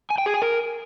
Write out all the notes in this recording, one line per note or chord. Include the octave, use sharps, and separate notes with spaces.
G#5
G5
G#4
G#5
A#4